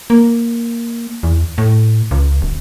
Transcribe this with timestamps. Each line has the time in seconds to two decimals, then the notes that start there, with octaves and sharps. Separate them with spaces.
0.10 A#3
1.23 E2
1.58 A2
2.11 C#2
2.42 D1